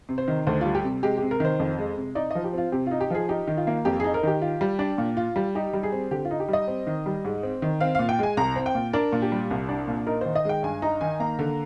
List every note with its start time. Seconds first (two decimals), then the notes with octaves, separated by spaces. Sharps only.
0.09 C3
0.18 C5
0.28 D#3
0.47 D2 C5
0.61 G3 F4
0.75 G4
0.84 C3
1.03 G#3 G4
1.18 C3 G4
1.31 A#4
1.40 D#3 C5
1.60 F2
1.78 G#3
1.97 C3
2.15 D#4 D5
2.31 F3 D#5
2.44 G4
2.53 C4 F4
2.72 C3 G4
2.87 D#4 F4
3.01 G4
3.10 F3 G#4
3.29 D#4 G4
3.47 D#3
3.57 F4
3.67 A#3
3.85 F2 G4
4.00 D#4 G#4
4.14 A#4
4.23 D#3 G4
4.42 F4
4.61 G3
4.79 D4
4.98 A#2
5.17 F4
5.36 G3
5.55 D#4 G4
5.73 G3
5.83 G#4
5.92 C4
6.11 D3 G4
6.25 F4
6.31 D#4
6.40 G4
6.48 G3 D#5
6.68 C4
6.87 D#3
7.06 G3
7.25 G#2
7.43 C4
7.62 D#3
7.80 C4 F5
7.95 A#2 F5
8.09 G5
8.19 G#3 G#5
8.37 C2 A#5
8.56 C4
8.66 G5
8.75 A#2
8.93 D4 A#4
9.12 A#2
9.22 G4
9.32 G3
9.51 C2
9.69 D4
9.88 A#2
10.07 D#4 A#4
10.21 D#3 C5
10.35 D#5
10.45 G#3 G5
10.63 G2 G#5
10.82 D#4 A#5
11.01 D#3 G#5
11.20 A#3 A#5
11.39 D3